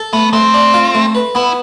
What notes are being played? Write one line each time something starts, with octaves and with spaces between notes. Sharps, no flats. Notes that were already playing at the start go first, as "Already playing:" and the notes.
Already playing: A4
A3 B3
A3 C4
D4
F4
A3
B4
B3 E4